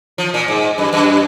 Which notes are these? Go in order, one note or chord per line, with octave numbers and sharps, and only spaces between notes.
F3
A#2
G#2
F#2
F#2